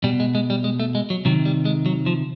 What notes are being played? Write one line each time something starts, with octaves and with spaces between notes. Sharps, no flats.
B2 G3
G#3
G#3
G3
G#3
A3
G#3
F#3
C3 D#3 F#3
G3
G#3
F#3
F3